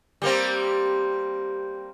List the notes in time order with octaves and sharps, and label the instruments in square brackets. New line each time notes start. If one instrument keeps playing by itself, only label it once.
[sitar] G3 A#3 C4